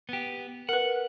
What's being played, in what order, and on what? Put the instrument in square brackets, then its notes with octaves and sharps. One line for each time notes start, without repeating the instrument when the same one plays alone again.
[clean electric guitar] B3 G4
[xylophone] A#4 B4 [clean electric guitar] F#5